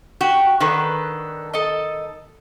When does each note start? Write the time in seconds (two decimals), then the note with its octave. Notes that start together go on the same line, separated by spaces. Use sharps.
0.21 F#4 G4
0.60 D#3 D4 A4 B4
1.54 A4 D#5